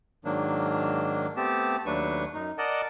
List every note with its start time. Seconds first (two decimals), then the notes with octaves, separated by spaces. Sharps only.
0.25 G#2 D#3 F#3 A#3 D4
1.36 A3 B3 C4 G4 A5
1.86 D#2 F#3 A3 D4 B4 C#6
2.34 F#2 D#4
2.58 A#4 D5 D#5 F#5 A5